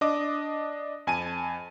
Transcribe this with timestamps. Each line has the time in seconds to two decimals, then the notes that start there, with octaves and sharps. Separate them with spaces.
0.01 D4 D#5 D6
1.07 F2 G#5 A5 D#7